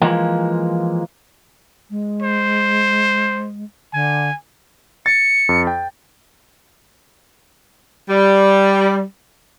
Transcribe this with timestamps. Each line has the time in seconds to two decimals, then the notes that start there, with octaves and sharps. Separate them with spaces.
0.02 E3 F3 G#3 A#3
1.90 G#3
2.22 C5
3.93 D3 G#5
5.06 A6 C#7
5.49 F2
5.67 G5
8.09 G3